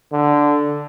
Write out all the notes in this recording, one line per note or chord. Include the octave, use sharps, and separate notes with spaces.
D3